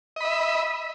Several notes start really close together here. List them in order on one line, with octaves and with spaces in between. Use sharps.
D#5 B5 E5